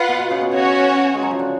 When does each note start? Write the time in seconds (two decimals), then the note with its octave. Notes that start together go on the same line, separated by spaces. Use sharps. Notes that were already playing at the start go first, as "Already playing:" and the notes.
Already playing: F4 B4 F#5
0.08 B2
0.19 B2
0.31 C#3
0.41 B2
0.52 C#3 C#4 F#4 C#5
1.14 G#3
1.22 F#3
1.31 F3
1.39 D3